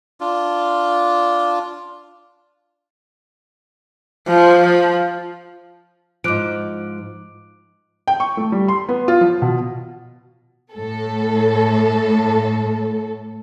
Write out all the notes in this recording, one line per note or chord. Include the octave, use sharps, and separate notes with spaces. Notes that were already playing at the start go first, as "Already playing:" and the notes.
D4 F4
F3
G#2 F3 D6 F#6 D7
G5
C#6
A3
G3
C6
B3
F4
F3
B2
A2 A4